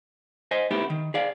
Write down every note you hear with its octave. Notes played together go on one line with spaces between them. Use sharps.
C5 D#5 G#5
A3 B3 D#4 E4 G4
D#3
G#4 D5 F5